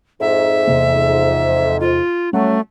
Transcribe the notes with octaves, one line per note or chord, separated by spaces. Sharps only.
F2 G#2 E5
E2 C3 A#3
F4
F#3 G3 A3 C#4 F#4